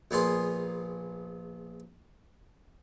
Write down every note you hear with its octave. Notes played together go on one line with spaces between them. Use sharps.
A#1 A#3 B3 G#4 C6